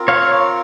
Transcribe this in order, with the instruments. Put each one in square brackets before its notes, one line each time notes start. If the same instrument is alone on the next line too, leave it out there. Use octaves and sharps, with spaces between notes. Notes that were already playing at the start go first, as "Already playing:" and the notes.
Already playing: [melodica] C4 F4 A#4
[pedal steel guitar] C#5 F5